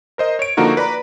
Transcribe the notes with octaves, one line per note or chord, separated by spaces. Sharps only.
A#4 C5 D#5
C#5 D7
D3 F3 A#3 D#4 F#4 A#4
B4 D5 A#5 B5